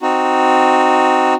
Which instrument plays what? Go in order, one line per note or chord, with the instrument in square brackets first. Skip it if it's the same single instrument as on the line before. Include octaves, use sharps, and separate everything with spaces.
[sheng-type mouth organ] C4 D#4 F#4